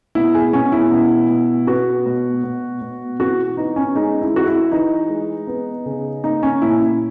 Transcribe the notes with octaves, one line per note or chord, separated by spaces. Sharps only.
B2 E4
G#4
B2 C#4
E4
B2
B2
B3 F#4
B2
B2
B2
E3 F#4
B3 D#4
C#4
G#3 D#4
E4
E3 F#4
E4
E3 D#4
G#3
B3
C#3
A#3 D#4
C#4
A#2 E4